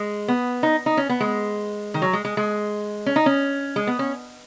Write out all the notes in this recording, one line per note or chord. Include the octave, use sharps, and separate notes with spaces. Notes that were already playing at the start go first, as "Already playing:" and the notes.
Already playing: G#3
B3
D#4
D#4
C#4
B3
G#3
D#3
F#3
G#3
G#3
G#3
C#4
D#4
C#4
G#3
B3
C#4